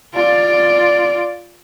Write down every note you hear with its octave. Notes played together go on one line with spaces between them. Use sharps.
F4 D5